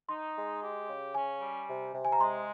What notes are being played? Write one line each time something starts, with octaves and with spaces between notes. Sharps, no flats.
D#4 C6
G#3
G4
C#3
C#4 G#5
G3
C3
C3
G#5
A#5
G#3 C6